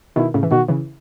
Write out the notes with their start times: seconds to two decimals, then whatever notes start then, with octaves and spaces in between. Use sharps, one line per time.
0.16 B2 D#3 E4
0.34 A2 C#3
0.43 E3
0.51 B2 D#3 F#4
0.68 C#3 E3